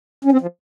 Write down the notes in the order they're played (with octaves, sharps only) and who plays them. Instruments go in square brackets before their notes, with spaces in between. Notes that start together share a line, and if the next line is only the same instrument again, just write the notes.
[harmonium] C#4
C4
F3